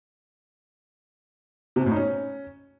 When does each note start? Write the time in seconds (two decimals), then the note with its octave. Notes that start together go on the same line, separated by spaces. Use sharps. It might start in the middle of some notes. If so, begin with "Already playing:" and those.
1.76 C3
1.81 B2
1.86 A2
1.91 D#4
1.96 C#4